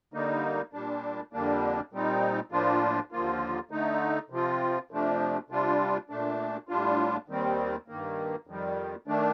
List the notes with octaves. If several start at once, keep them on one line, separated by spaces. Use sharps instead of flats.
D3 G3 A#3 D#4
A#2 G3 D4
F2 D3 G3 A#3 D4
A#2 G3 C4 D#4
A2 F3 A#3 D4 F4
D#2 D3 F3 A#3 F4
D3 A3 D#4
C3 F3 C4 F4
F2 C3 F3 A3 D4
C3 G3 D4 F4
A#2 A3 D4
A2 G3 D4 F4
D#2 D#3 G3 C4
G2 D#3 A#3
F2 D#3 G3
D#3 A3 D4